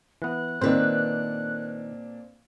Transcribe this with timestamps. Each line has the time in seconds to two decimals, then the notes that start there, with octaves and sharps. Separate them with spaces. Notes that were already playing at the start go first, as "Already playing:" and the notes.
0.22 E3 B3 F#6
0.61 A#2 D#3 C4 D4 B4 C5